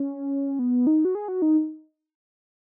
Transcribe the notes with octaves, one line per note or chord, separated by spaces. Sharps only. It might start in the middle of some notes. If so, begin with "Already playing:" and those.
Already playing: C#4
B3
D#4
F#4
G#4
F#4
D#4